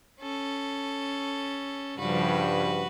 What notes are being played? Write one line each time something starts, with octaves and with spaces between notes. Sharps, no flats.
C#4 A4
G2 C#3 F3 G3 F#4 B4